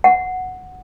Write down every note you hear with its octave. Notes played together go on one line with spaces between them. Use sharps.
F#5